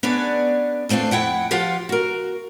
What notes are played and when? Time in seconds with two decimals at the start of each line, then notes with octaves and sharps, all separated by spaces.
0.03 B3 C#4 D4 G#4 D5
0.89 E2 A3 C4 D4 F4
1.11 F2 E4 F#5 G5
1.51 F3 F4 G4 F5 F#5
1.89 F#4 A#4